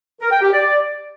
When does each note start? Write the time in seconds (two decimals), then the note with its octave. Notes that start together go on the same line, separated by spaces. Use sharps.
0.21 A#4
0.31 G5
0.42 G4
0.52 D5